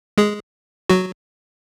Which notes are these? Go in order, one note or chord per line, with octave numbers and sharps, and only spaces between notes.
G#3 G#4
F#3 F#4